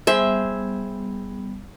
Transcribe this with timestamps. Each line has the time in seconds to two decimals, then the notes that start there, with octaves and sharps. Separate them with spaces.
0.07 G3 B3 G#4 C5 E5